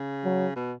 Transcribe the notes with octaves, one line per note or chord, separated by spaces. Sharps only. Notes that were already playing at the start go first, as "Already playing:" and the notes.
Already playing: C#3
F#3
B2